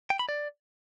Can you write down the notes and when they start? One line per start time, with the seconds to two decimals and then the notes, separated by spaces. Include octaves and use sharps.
0.10 G5
0.19 B5
0.29 D5